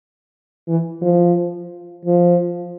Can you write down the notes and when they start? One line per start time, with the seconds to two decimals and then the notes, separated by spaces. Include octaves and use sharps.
0.68 E3
1.02 F3
2.06 F3